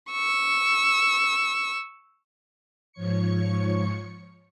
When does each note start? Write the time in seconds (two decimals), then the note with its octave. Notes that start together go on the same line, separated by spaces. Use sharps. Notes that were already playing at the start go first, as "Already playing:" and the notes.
0.11 C#6 E6
2.92 G#2 F3 C#5 C#6 C#7